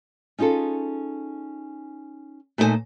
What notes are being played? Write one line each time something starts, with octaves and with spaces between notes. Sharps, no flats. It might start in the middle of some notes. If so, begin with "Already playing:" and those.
C#4 D#4 F4 G#4 A4
A#2 A3 D#4 G4 C5 G#5